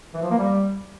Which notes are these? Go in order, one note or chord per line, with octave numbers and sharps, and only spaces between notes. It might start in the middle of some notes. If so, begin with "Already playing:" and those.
E3
F3
A#3
G3